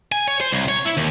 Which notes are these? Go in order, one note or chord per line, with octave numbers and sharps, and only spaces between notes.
G#5
C#5
C5
C2
C#5
E4
D#2